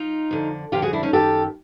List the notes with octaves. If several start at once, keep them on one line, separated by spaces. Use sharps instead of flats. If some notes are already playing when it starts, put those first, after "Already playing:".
Already playing: D#4 F4
F2 D3
F2 D3 F4 G4
F#4 G#4
D4 E4
C#4 D#4
F#2 D#3 G4 A4